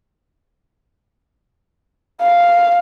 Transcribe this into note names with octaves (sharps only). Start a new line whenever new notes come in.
F5